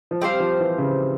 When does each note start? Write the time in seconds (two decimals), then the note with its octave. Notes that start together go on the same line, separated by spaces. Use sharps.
0.11 F3
0.22 G3 C4 G4 C5 F5
0.40 F3
0.60 E3
0.78 C#3